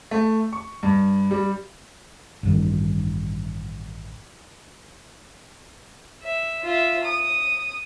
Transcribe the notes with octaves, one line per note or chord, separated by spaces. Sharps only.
A3
C#6
G2
G3
A1 G2 D#3
E5
F4 E5
D#6